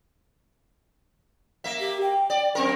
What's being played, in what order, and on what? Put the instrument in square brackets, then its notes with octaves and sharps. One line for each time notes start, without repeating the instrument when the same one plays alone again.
[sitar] A#3 E5
[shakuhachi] G4
G5
[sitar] D5
F#2 C4 A#4